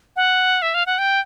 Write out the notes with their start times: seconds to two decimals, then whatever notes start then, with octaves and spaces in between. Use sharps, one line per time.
0.16 F#5
0.62 E5
0.74 F5
0.86 F#5
0.98 G5